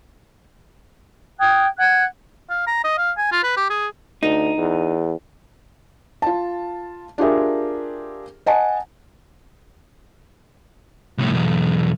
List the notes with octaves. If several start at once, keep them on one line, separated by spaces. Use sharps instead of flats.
G5 D#6 F#6 G#6
F#5 F#6 G#6
F5
A#5
D#5
F5
G#5
F4
B4
G4
G#4
D2 D#4
E2
F4 A5
D4 F4 G4 G#4 A#4 E5
D#5 F#5 G#5 A5
C2 A2
B1 E2